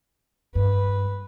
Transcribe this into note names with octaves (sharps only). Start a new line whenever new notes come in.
G2 B4